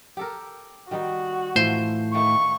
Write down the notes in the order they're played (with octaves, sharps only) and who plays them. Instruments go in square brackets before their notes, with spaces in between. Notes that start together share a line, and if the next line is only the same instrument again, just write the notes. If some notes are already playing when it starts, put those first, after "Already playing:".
[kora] G4 A4 A#4
[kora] D#3 G3 D#4 [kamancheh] F#4
[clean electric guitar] A2 [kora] E3 F3 [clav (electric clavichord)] C5
[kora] D#3 A3 A#3 [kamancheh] C#6